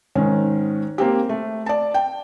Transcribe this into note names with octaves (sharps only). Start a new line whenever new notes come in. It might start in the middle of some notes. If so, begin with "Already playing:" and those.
G#2 D#3 C#4
A#3 C4 G4
A3
D5 A5
G5